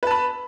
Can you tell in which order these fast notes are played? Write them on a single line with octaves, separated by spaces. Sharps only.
B4 A5 B5